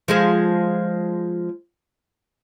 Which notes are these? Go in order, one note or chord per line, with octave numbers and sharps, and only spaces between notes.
F3 G#3 G#4